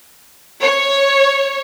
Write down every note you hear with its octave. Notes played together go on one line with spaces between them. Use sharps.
C#5